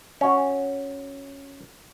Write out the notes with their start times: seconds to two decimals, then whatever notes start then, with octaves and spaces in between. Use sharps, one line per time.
0.21 C#4 F#4